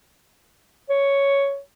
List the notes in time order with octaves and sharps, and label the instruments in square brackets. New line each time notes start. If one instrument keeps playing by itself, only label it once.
[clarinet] C#5